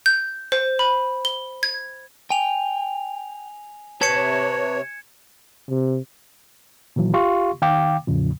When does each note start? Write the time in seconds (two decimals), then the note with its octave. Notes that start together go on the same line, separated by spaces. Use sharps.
0.06 G6
0.52 C5
0.79 B5
1.25 G7
1.63 G#6
2.30 G5 G#5 F7
4.01 C3 B4 C#5 A5 G#6 C#7 E7
5.69 C3
6.96 A#2 D#3 E3 F#3
7.14 F4 G4 F5 C6 C#6
7.62 D#3 F5 G5 D6
8.07 E2 A2 C#3 F3